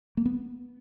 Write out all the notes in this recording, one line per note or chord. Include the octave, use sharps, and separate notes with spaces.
A#3
B3